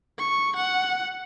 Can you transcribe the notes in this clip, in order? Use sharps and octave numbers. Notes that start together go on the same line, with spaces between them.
C#6
F#5